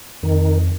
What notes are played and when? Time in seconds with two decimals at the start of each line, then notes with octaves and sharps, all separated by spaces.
0.23 F2 D#3